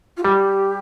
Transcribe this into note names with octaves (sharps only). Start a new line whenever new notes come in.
F4
G3 G4